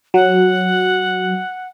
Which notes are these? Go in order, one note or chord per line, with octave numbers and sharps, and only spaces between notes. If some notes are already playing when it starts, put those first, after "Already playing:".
F#3 F#5